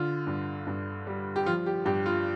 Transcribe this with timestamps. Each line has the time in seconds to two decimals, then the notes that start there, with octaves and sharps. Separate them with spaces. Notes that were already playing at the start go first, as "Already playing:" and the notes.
Already playing: D3 F4
0.27 G2
0.67 G2
1.07 G3
1.36 G4
1.46 F3 F4
1.66 G4
1.85 G2 G4
2.06 F4